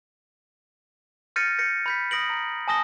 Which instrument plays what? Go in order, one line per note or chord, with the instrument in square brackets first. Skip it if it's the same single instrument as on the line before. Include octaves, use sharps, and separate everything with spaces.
[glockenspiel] F6 G6 A6 A#6 C#7 D#7
G6 A#6 C#7
B5 G6 B6
D#6 A#6 D7 F#7
A#5
G#5 A5 D#6 A#6 G7